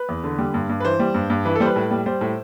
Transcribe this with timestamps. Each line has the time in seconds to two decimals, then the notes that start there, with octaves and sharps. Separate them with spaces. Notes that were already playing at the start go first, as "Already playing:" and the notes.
Already playing: B4
0.09 E2
0.24 D3
0.38 G3
0.54 G2
0.69 G2
0.80 B4
0.85 E3 C5
1.00 G3
1.15 G2
1.30 G2
1.45 E3 B4
1.55 A4
1.60 G3 C5
1.66 B4
1.76 A2
1.91 G3
2.06 G3 C5
2.21 A2